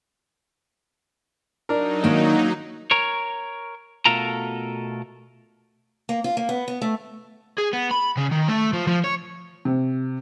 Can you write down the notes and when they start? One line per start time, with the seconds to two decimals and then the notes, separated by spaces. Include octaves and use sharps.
1.69 F#3 D4 D#4 A#4
2.04 D#3 A#3 C#4
2.91 A#4 C#5
4.05 B2 A3 F4 A4 A#4 A#5
6.09 A#3
6.24 F4
6.37 A#3
6.49 B3
6.68 B3
6.82 A3
7.58 G#4
7.73 B3
7.91 B5
8.17 C#3
8.31 D#3
8.48 A3
8.73 F3
8.87 F3
9.04 C#5
9.65 C3